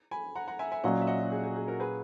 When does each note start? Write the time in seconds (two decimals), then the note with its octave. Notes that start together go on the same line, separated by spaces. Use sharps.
0.11 G#5 B5
0.35 F#5 A#5
0.48 F#5 A#5
0.59 E5 G#5
0.72 E5 G#5
0.84 A#2 F#3 C#4 D#5 F#5
1.01 E5
1.07 D#5 F#5
1.23 F#4
1.32 G#4
1.43 G#4
1.56 G#4
1.68 F#4 A#4
1.80 G#4 B4